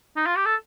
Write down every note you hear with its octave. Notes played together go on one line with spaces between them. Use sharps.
D#4
F4
G4
A4